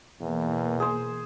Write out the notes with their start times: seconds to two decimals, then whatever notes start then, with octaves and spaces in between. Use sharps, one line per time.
0.21 E2 B2 E3 A#3
0.80 G#4 C5